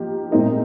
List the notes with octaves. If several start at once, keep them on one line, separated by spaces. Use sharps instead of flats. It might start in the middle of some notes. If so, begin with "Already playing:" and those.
Already playing: F3 A#3 D#4 G4
A#2 G#3 C4 D#4 A#4